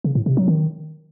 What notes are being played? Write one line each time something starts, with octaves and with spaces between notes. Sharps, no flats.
C#3
A2
C3
F#3
D#3